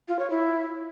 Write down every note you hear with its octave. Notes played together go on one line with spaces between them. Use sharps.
F4
C#5
E4